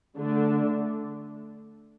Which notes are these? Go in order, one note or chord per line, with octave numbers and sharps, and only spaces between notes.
D3 A3 D4